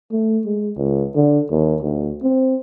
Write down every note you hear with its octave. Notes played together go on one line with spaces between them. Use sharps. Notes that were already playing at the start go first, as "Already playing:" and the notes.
A3
G#3
C#2
D3
D#2
D2
C4